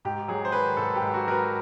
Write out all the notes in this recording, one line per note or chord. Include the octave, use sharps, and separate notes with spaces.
G#2 G4
F#3 G#4
C5
D#3 B4
G#2 A4
G4
G#2
F#4
F#3 A#4
B4